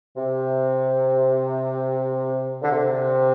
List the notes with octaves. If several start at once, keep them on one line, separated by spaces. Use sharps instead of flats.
C3
D3
C3